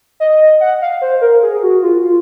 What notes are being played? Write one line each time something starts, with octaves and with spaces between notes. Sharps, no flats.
D#5
F#5
F5
C5
A#4
G#4
F#4
F4
F4